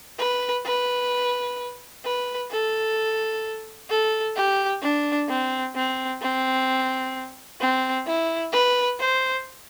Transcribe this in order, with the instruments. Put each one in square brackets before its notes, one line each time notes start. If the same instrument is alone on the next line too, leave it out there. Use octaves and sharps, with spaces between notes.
[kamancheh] B4
B4
B4
A4
A4
G4
D4
C4
C4
C4
C4
E4
B4
C5